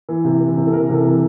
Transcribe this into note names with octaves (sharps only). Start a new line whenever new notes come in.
E3
C3
E3
C3
A4
E3 A#4
C3 A4
E3